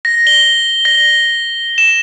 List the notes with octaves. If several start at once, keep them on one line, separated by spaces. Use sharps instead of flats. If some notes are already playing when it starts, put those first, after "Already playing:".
A#6
G7
A#6
E7